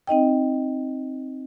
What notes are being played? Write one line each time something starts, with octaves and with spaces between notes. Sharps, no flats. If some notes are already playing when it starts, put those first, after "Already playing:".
C4 D#4 D#5 G5